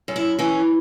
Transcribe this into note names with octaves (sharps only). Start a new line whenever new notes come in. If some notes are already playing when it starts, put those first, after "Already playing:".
F#2
E4
E3 C#4